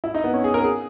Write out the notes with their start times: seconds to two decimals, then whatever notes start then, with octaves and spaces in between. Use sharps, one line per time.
0.04 E4
0.14 D#4
0.24 B3
0.33 C#4
0.44 G#4
0.54 A#4
0.64 G#4